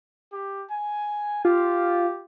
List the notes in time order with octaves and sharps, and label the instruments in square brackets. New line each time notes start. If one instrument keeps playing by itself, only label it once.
[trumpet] G4
G#5
[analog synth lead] F4 [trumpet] G4